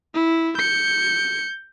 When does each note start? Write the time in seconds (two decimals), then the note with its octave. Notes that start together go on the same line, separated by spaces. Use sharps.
0.14 E4
0.57 G6 C#7